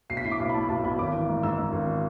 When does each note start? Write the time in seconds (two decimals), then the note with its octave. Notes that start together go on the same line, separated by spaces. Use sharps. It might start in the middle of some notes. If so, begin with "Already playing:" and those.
0.10 B1 C7
0.17 B6
0.25 A2 C7
0.32 D6
0.40 B1
0.49 B5
0.54 A2 A5
0.69 B1 A5
0.84 B1 B5
0.99 G#1 D6
1.13 E3
1.29 G#2
1.43 G#2 E6
1.58 G#2
1.73 G#1